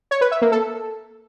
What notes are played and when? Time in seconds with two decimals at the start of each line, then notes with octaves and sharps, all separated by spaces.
0.11 C#5
0.21 B4
0.31 E5
0.42 A#3
0.52 A4